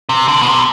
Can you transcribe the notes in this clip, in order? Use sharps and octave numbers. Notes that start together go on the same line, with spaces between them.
C3
D3
B2
C3